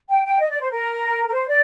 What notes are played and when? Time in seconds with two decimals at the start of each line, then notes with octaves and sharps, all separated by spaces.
0.09 G5
0.25 G5
0.40 D#5
0.50 D5
0.60 C5
0.71 A#4
1.27 A#4
1.33 C5
1.48 D5